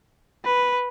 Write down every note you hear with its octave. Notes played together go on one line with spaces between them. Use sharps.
B4